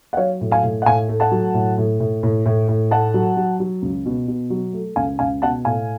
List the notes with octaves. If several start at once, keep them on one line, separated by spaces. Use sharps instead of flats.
F#5
F#3 C#5 F5
A2
F5 G#5
A2
F#5
A2 F5 G#5
A3
F#5 A5
F#3
A2
A2
A2
A2
A2
A2
A3 F#5 A5
F#3
F#3
F#3
C#2
B2
B2
F#3
A3
C#2 F5 G#5
C#2 F5 G#5
B2 F#5 A5
A2 F5 G#5